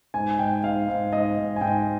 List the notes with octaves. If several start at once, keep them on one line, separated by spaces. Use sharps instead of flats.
G#2 G#5
G#2 G5
G#2 F5
G#2
G#2 D#5
G#2
G#5
G#2 G5